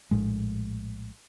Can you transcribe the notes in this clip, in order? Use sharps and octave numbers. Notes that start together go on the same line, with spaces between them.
A#1 A2 G#3